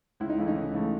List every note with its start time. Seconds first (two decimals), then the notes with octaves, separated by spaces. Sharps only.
0.20 C#2 E4
0.29 D#4
0.38 C#3 E3 A3
0.47 D#4
0.56 C#2
0.74 C#3 E3 A3